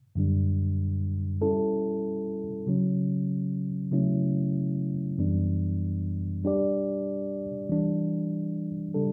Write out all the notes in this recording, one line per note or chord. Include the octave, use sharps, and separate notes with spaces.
F#2 D3 G3 D4
G3 C#4 E4 A4
C#3 F#3 C#4
C#3 F#3 A3 C#4 E4
F#2 E3 G3 B3 D4
G3 D4 G4 D5
E3 G3 D4
C#3 G3 D4 A4